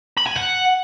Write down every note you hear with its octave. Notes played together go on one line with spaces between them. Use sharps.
B5
G#5
F#5